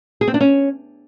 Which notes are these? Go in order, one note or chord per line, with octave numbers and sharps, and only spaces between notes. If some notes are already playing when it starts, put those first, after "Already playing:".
G#4
C4
D4
C#4